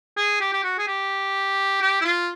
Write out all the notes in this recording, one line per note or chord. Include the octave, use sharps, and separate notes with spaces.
G#4
G4
G4
F#4
G#4
G4
G4
E4
F4